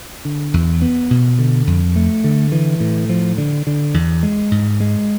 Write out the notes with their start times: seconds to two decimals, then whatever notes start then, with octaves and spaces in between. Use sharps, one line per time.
0.25 D3
0.54 E2
0.82 B3
1.10 B2
1.39 D3
1.67 F2
1.96 A3
2.24 D3
2.52 E3
2.80 A2
3.09 F3
3.38 D3
3.67 D3
3.94 E2
4.23 G#3
4.51 G#2
4.80 G#3